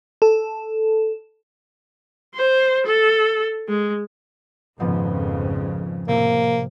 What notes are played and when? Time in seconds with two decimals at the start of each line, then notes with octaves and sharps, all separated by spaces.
0.22 A4
2.34 C5
2.86 A4
3.69 G#3
4.80 G#1 F2 G#2 C#3 F3 B3
6.08 A2 C3 A#3